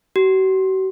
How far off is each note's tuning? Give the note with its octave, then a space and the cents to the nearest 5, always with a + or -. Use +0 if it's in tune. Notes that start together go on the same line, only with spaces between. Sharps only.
F#4 +45